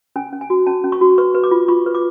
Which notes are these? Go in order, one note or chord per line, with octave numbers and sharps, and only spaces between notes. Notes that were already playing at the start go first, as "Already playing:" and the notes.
C#4 G#5
C#4
G#5
F#4
C#4 A5
C#4
C#6
F#4
B4 C#6
B4
D6
F4
F4 C#6
B4
D6